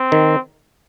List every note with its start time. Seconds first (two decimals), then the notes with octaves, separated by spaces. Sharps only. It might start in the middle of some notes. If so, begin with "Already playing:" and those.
Already playing: C4
0.12 D#3